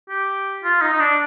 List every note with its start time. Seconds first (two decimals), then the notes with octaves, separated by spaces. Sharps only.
0.09 G4
0.64 F4
0.81 D#4
0.93 D#4
1.00 D4